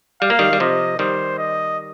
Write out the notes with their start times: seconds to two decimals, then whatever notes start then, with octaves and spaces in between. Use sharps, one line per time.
0.22 G3 F5
0.30 A#3
0.39 D#3 G3
0.53 G3
0.60 C3 F3 D#5
0.99 D#3 G3 C5
1.38 D#5